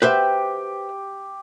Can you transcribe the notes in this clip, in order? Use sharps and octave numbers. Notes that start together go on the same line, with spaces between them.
G4 B4 C5 E5